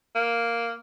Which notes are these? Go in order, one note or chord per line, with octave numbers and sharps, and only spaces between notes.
A#3